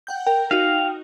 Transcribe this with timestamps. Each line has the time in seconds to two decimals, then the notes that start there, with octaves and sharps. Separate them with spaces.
0.07 F#5 G5 G6
0.27 A#4 G5
0.51 D#4 F#4 F5